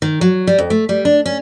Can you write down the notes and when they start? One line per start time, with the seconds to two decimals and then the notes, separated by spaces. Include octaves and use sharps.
0.02 D#3
0.21 F#3
0.47 G3
0.58 F2
0.70 A3
0.89 G3
1.05 D4
1.26 C#4